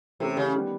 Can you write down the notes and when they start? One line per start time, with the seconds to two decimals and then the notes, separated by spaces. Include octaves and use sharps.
0.20 C3 E3 A3 C#4 E4 G4
0.37 C#3
0.54 D#3 G3 B3